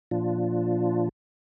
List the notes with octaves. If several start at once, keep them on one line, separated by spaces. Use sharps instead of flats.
A#2 F3 D4 F4